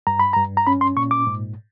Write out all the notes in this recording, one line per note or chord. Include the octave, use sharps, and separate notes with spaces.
G2 A#5
B5
G2 A#5
A#5
C#4 B5
C6
A#2 C#6
D6
G#2